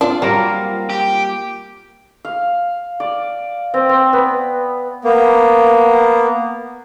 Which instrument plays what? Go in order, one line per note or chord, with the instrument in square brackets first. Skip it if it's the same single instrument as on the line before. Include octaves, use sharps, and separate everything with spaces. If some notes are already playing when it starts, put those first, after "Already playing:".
[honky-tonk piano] C4 F4 [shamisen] D4
[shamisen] F#3 [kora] G3 A#3 A#4
[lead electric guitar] G4
[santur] F5
D5
C4
C4
B3
[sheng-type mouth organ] A#3 B3